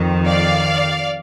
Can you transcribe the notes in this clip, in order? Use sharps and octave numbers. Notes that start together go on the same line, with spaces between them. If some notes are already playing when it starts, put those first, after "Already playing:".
Already playing: F2 D#3
D5 F5